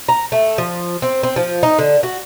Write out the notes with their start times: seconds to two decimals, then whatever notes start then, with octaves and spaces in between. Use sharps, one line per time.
0.09 A#5
0.32 A3
0.58 F3
1.02 C4
1.23 C4
1.36 F3
1.63 D#4
1.79 D3
2.03 F#4